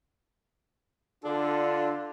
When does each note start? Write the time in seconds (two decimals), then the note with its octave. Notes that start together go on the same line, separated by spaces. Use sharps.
1.24 D3 D4 F4 A4